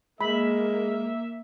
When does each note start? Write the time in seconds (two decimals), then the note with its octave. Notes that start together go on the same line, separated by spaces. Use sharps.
0.21 G#3 A#3 E5 B5